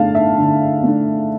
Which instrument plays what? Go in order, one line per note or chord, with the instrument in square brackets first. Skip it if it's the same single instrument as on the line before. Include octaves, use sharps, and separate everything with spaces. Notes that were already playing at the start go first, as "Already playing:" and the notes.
Already playing: [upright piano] D3 A3 D4 F5 A5
E5
D3
A3 D4